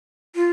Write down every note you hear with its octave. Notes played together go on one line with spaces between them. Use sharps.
F4